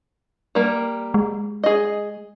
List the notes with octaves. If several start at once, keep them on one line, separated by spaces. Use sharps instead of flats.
G3 A#3
G#3
G#4 D#5